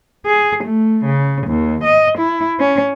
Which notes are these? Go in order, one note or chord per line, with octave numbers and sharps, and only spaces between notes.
G#4
A3
C#3
D#2
D#5
E4
C#4